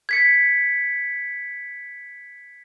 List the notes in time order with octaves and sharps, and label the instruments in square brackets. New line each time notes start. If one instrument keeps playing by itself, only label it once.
[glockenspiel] G#6 B6 C#7